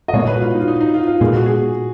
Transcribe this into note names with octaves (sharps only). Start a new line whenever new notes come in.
D#5
A#2 G#3 B3 C#5
B4
F#4
F4
D#4
F4
D#4
D#4
F4
F4
A#2 G#3 B3 G#4
F#4
G#4